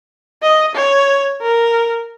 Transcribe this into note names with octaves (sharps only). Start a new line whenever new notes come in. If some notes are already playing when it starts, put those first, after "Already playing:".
D#5
C#5
A#4